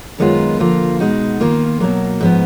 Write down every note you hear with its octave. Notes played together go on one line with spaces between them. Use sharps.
F#2 D#3 G#3 B3 F4
D3 F3 A#3 F4
B2 G#3 D#4 F#4
D#3 A#3 F4
B2 F#3 A#3
G#2 F3 B3